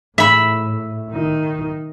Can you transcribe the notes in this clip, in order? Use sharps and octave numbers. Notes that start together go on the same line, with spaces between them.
A2 E5 B5
D#3 D#4